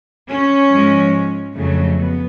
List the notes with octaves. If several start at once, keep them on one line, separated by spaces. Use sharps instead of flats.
C#4
G#2 F3 G#3
F2 C#3 F#3 A3
B3